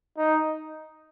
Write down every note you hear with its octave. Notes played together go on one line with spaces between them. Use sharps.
D#4